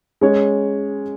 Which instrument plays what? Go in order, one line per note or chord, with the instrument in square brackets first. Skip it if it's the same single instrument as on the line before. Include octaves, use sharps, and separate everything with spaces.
[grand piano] G#3 C#4 G#4 C#5